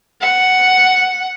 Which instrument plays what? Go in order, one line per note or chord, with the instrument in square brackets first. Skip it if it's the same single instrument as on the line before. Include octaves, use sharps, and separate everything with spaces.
[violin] F#5